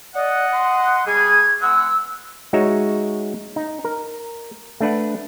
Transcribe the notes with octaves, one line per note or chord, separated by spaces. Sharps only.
D5 D#5 F#5
C6
B2 G3 G#4 G#6
G#3 B3 F#5 E6
G#3 D#4 F#4 C#5 E5
D#4
A#4
A3 D4 B4 F#5